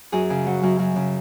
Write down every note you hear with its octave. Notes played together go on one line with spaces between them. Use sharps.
F#2 G#4
C#3
F#3
F#2
F#2
C#3